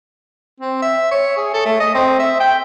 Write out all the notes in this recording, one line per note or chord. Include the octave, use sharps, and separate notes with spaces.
C4
E5
C#5
G#4
A4
A3
D#5
C4
E5
G5